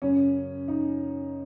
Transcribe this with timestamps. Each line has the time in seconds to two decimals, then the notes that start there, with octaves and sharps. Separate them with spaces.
0.02 F#2 C#3 C#4
0.68 D#4